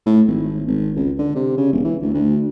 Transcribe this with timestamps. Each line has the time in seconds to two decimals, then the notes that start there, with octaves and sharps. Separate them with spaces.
0.06 A2
0.28 G#1
0.68 G#1
0.96 C#2
1.19 D3
1.35 C3
1.58 C#3
1.72 E1
1.84 E3
2.02 D2
2.14 D2